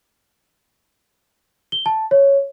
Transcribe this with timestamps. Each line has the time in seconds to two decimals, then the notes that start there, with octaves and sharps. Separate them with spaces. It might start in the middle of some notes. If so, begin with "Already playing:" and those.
1.72 G7
1.86 A5
2.11 C#5